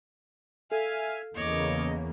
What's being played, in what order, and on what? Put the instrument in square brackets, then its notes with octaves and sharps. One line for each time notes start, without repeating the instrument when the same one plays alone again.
[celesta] A4 [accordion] E5 G#5 F6 [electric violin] F5
[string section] E2 C#3 A#3 [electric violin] C#5 D6 [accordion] D#5